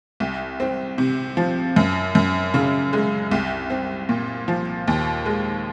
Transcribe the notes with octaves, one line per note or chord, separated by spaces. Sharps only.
C2
C4
C3
F3
F#2
F#2
C#3
G#3
C2
C4
A#2
F3
D#2
G#3